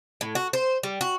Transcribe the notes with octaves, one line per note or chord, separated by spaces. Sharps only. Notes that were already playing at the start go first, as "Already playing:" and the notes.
A2
F#4
C5
G3
F#4